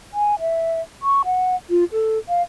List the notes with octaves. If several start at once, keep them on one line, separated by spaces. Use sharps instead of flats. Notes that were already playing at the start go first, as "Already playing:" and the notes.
G#5
E5
C#6
F#5
F4
A4
F5